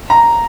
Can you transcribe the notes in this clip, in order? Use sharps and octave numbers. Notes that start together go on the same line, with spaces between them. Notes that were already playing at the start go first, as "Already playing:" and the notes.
A#5